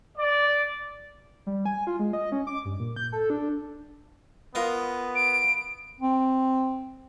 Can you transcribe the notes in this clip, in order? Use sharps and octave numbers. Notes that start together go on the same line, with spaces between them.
D5
G3
G#5
F4
G#3
D#5
C#4
D6
G2
A#2
G6
A4
D4
B3 F4 A#4 D#5
D7
C4